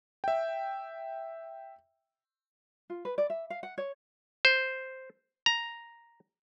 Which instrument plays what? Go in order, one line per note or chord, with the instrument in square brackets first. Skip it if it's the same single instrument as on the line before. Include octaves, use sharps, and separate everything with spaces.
[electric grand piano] E5 G5
[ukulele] F4
B4
D5
E5
F5
F#5
C#5
[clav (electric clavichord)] C5
A#5